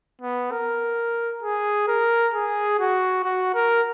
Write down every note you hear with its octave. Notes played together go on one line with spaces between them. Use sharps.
B3
A#4
G#4
A#4
G#4
F#4
F#4
A#4